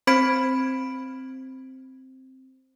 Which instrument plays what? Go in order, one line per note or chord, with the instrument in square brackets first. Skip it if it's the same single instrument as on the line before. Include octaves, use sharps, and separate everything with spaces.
[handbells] C4 C5 B5 G#6 B6 D7